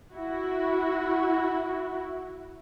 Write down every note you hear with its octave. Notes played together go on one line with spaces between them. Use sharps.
E4 F#4